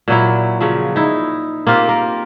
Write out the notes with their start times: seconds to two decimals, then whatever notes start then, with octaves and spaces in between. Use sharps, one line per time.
0.08 A#2 F#3 E4
0.61 C#3 F3 F#3
0.96 D#4 E4
1.67 A#3 C4 F4 G4
1.89 A#4